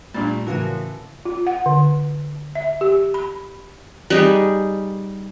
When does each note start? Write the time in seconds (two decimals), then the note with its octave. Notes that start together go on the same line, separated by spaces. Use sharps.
0.14 A#2 G3 A3 D4 A5
0.47 A2 C#3 E3 F3 F#4 A#4
1.25 F4
1.47 F#5
1.66 D3
2.55 E5
2.81 G4
3.14 B5
4.10 G3 D#4 G#4